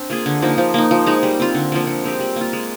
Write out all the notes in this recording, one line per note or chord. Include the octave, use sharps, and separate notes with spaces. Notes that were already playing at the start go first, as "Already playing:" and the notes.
Already playing: C4 D4
A#3 F4 G#4
D3
F3 A#3 D#4
F3
A#3 D#4
F3
G#3 D#4
G3
C4 F4
D3
F3 A#3
D3
G#3 C4 G4
G3
A#3 F4
G#3